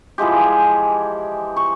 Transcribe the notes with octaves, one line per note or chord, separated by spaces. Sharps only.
E3 F3 G#3 G4
C#6